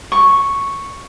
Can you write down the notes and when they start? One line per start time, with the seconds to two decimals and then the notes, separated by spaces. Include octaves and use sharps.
0.12 C#6